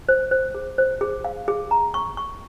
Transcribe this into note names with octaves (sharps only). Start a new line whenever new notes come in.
C5
C5
G#4
C5
G#4
F5
G#4
A#5
C#6
C#6